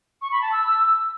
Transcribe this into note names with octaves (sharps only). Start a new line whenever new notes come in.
C#6
B5
A5
E6